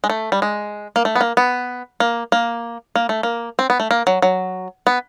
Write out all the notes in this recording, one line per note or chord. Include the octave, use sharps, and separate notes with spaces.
G#3
A3
G3
G#3
A#3
A3
B3
A#3
B3
A#3
A#3
A#3
A3
A#3
C4
B3
A3
A#3
F#3
F#3
B3